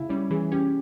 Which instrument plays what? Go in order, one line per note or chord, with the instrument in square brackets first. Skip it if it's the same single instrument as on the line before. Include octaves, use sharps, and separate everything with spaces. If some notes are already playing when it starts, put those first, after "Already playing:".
Already playing: [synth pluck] C#3 [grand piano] E4
[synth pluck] G3 [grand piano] C#4
[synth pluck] E3 [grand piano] G#4
[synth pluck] C#4 [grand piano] G4